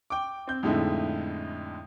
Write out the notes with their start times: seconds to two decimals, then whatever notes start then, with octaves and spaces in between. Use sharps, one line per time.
0.10 G5 D6
0.47 C4 G6
0.63 F2 A2 D3 G#3 D#4 E4